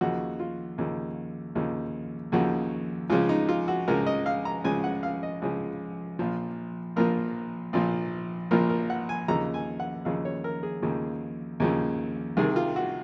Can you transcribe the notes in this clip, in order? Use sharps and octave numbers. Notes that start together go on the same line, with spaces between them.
D#2 C#3 F3 F#4
F4
D#2 C#3 F3
D#2 C#3 F3
D#2 C#3 F3 F#4
C#2 C#3 F3 F4
D#4
F4
F#4
C#2 C#3 F3 A#4
D#5
F5
A#5
C#2 C#3 F3 G#5
F#5
F5
D#5
C#2 C#3 F3
A#1 A#2 F3
A#1 A#2 F3 A#4
A#1 A#2 F3
A#1 A#2 F3 A#4
A#4
F#5
G#5
D#2 C#3 F3 A#5
G#5
F#5
D#2 C#3 F3 F5
C#5
A#4
G#4
D#2 C#3 F3
D#2 C#3 F3
C2 C3 D#3 G#4
F4
F#4